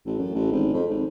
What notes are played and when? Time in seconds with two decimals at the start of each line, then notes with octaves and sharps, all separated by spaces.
0.06 A1
0.18 F#2
0.35 A1
0.51 G#1
0.72 F2
0.89 G#1